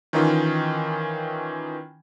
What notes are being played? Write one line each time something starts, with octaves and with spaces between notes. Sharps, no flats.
D#3 E3 C#4 D#4 F4